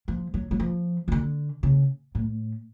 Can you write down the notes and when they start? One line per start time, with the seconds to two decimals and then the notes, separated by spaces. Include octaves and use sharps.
0.08 F3
0.34 F#3
0.51 F#3
0.60 F3
1.08 C#3
1.12 D3
1.63 C#3
2.15 A2